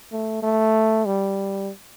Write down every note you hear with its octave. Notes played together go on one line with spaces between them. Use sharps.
A3
A3
G3